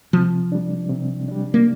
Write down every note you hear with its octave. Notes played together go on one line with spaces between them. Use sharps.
C3 F3
G3 D4
C3
G3 D4
A#3